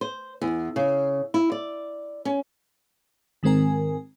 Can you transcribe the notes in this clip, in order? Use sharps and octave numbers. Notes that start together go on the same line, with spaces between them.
C5
E2
C#3
E4
D5
C#4
G#2 D#3 G#3 C4 A#4 G#5